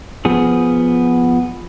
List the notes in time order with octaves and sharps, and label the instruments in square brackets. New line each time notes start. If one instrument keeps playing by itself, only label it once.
[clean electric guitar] F3 B3 G#4